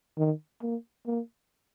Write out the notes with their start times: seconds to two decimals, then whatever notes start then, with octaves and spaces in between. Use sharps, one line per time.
0.18 D#3
0.62 A#3
1.07 A#3